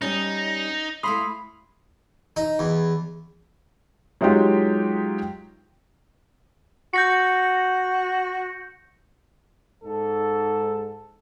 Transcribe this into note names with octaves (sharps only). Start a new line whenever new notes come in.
G3 C#4 D#4
A3 E4 F5 B5 C6 D#6
D#4
E2
F#3 G#3 D#4 F4 G4
F#4 G6 A#6 C#7
G#2 A4